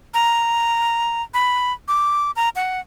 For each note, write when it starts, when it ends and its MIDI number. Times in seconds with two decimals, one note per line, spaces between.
0.14 1.22 82
1.34 1.73 83
1.88 2.31 86
2.36 2.49 82
2.56 2.80 78